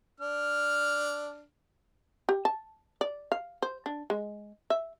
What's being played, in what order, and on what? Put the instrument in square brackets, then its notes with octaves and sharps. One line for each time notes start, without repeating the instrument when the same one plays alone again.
[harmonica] D4 F6
[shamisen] G4
A5
D5
F5
C5
D4
G#3
E5